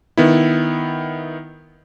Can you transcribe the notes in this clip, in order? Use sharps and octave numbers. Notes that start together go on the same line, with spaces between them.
D#3 B3 E4